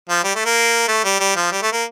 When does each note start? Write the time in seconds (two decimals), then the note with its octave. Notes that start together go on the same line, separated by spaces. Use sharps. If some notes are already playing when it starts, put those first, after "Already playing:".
0.09 F3
0.24 G3
0.35 A3
0.45 A#3
0.88 A3
1.04 G3
1.20 G3
1.36 F3
1.52 G3
1.62 A3
1.73 A#3